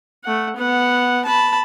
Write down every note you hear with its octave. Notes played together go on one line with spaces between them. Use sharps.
A3 F#5
B3 F#5
A5 B5